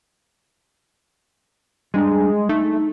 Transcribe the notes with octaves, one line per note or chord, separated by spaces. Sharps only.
G3 G#3 D4 A#5
A3 D#4